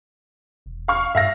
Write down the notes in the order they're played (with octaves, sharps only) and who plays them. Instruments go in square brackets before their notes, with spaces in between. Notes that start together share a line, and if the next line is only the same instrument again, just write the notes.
[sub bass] E1
[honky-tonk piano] F5 C#6 F6
[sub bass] G2 [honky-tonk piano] E5 F5 A#6